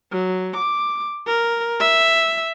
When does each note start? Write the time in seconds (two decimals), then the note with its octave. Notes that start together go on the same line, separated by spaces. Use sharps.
0.12 F#3
0.56 D6
1.27 A#4
1.80 E5